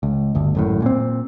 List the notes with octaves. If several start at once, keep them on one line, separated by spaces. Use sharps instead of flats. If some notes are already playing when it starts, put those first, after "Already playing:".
C#2
G1 D2
G#1 F#2 A2
A#2 C4